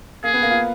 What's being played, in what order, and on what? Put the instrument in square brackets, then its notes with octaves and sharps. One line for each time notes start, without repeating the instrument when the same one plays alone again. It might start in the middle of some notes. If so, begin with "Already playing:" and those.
[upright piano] A#3 [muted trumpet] G#4
[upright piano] B3
A#3
F4